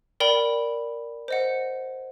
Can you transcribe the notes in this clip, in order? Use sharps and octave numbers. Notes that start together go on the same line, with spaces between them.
A#4 D5 G5 B5
C5 D#5 F#5